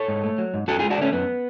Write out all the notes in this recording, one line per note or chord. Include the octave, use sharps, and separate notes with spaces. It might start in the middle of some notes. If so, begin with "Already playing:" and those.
Already playing: A4 C#5
G#2
A3
F#3
G#2
F#2 F#4 A4
F4 G#4
G#3
D4 F#4
D3 A3 C#4
F#2 B3